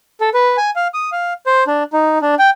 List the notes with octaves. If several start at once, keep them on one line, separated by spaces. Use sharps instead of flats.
A4
B4
G#5
F5
D#6
F5
C5
D4
D#4
D4
G5